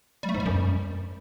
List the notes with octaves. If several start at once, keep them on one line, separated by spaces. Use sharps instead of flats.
G3
A3
G#2
G3
F#2